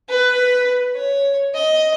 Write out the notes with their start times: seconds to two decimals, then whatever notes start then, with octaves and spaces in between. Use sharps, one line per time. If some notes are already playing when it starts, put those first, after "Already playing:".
0.09 B4
0.95 C#5
1.54 D#5